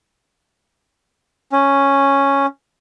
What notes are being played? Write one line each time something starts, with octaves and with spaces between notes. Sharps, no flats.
C#4